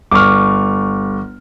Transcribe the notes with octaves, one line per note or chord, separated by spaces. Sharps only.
G1 C#6 D6 F6